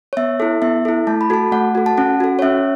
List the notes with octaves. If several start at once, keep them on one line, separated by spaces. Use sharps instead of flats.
C#5
B3 E5
E4 A4
B3 E5
E4 A4
A3 A5
B5
F#4 A4 A5
A3 F#5
F#4 A4
A5
C#4 F#5
F#4 A4
C#5
C#4 E5